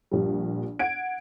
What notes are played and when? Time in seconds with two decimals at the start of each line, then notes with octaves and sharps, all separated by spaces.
0.11 A#1 G3
0.79 F#5 G#6 D7